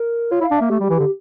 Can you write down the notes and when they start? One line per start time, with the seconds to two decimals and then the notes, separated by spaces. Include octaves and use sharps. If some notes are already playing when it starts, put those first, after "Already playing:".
Already playing: A#4
0.31 F4 C#5
0.41 E4
0.44 F5
0.51 D4
0.58 A#3 E5
0.70 A3 G4
0.80 G3
0.84 G4
0.90 E3
0.97 D3 G4